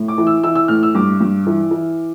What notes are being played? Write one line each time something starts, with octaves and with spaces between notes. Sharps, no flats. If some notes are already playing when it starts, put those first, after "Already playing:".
Already playing: A2
D6
E3
E6
E3 E6
E6
A2 F6
E6
G2 D6
G2
E3
E3